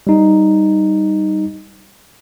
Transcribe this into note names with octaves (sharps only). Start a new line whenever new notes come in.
G3 D#4